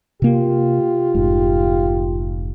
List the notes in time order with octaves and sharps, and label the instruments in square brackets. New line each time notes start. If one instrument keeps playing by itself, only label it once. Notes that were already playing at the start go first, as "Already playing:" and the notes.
[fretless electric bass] C3 A#3 [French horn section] F4 G4
[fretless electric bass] F1 G#2